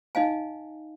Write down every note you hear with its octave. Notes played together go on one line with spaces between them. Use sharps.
D#4 D#5 F5 G#5